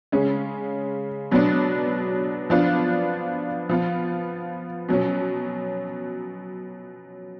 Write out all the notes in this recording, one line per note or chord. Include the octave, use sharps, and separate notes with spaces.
C#3 G#3 C#4
B2 F#3 B3 D4
F3 B3 D4 F4
F3 B3 F4
B2 F#3 C#4